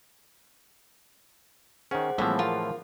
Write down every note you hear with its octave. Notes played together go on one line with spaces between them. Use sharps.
D#3 C#4 G#4 C5 F#5
A2 E3 F3 G3 A#3 C4 E5
F4 A#4 F5